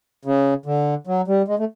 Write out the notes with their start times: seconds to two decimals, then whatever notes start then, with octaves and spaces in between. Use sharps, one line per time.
0.25 C#3
0.66 D3
1.07 F#3
1.28 G3
1.48 G#3
1.59 A3